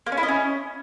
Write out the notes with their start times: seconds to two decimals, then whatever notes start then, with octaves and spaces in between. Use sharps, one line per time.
0.06 A#3
0.12 C#4
0.17 E4
0.23 D#5
0.28 C#4